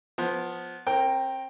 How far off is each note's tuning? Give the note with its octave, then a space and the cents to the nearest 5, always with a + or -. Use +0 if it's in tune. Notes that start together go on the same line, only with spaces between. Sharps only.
F3 +15 B3 +0
C4 +35 A#4 -5 G5 +0